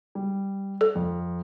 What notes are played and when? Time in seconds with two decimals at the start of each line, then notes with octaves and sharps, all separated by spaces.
0.15 G3
0.81 A4
0.95 F2